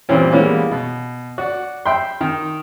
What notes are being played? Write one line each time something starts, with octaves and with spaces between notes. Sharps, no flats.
A#2 E3 G3 A#3 C4 C#4
E3 G3 G#3 A#3 B3 C#4
B2
F#4 D5
E5 G5 B5 C6
D#3